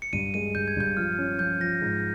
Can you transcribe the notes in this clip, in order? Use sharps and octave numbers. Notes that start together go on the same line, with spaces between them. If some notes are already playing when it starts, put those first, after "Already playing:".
C#7
G2 D#7
G#3 D#7
G2 G6
G#6
G2 G6
F3 F6
C#4
F3 G6
F3 A#6
G#2